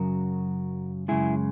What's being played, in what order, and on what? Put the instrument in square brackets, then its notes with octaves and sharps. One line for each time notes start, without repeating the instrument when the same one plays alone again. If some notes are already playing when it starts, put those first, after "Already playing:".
Already playing: [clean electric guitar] F#2 C#3 F#3 F#4 A#4
F#2 C#3 G#3 E4 G#4